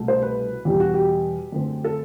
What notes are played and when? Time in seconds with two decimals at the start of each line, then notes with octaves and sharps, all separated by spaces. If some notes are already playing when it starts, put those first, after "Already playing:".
Already playing: C2 B2 A3
0.08 C5
0.22 B4
0.65 E2 B2 G3 G4
0.80 F#4
0.94 G4
1.52 F#2 D3 A3 C4
1.85 A4